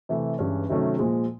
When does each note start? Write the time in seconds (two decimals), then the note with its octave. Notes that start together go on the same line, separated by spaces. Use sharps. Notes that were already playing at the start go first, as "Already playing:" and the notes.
0.09 C3 E3 A3 C4 E4
0.39 G2 E3 G#3 C#4
0.69 C3 D#3 F#3 A3 C#4
0.99 A#2 F3 G#3